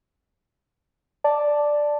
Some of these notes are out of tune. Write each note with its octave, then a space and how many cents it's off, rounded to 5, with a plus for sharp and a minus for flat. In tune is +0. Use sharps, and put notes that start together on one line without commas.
D5 +0 A5 +0